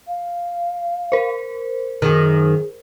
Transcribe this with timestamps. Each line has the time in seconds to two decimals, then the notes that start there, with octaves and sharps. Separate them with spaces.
0.07 F5
1.12 A#4 C5
2.02 F#2 D#3 G#4